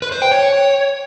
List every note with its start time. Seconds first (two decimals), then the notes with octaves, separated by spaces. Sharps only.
0.02 B4
0.12 C5
0.22 G5
0.31 C#5